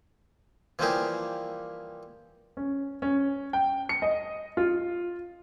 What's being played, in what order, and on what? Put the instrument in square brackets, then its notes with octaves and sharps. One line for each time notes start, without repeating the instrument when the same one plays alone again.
[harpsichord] E3 F3 G3 A#3 G4 G#4
[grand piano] C#4
C#4
G5
C#7
D#5
F4